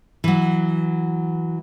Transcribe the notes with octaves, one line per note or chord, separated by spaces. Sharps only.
E3 F#3